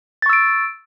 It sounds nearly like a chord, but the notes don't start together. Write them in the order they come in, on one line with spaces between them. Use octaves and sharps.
A6 C#6 E6 D7